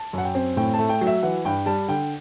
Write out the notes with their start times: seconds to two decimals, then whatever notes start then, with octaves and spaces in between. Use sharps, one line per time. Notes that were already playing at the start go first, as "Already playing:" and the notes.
Already playing: A5
0.13 F#2 F#5
0.24 G5
0.35 C4
0.57 A2 G5
0.74 A5
0.79 A3
0.89 G5
1.01 F#3
1.07 E5
1.23 E3 F#5
1.45 G2 G5
1.66 G3 A5
1.88 D3 G5